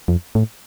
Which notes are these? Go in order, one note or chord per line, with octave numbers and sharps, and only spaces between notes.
F2
A2